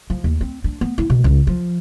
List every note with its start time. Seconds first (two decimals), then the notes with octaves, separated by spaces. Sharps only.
0.10 F3
0.24 D#2
0.41 C4
0.64 D4
0.81 B3
0.98 E4
1.10 B2
1.24 C#2
1.47 F3